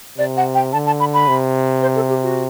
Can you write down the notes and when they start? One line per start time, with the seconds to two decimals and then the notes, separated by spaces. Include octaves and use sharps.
0.18 C3 D5
0.37 F#5
0.55 G5
0.73 D3 A5
0.86 A5
1.00 B5
1.14 B5
1.28 C3
1.82 C5
1.96 A4
2.09 G4
2.23 F#4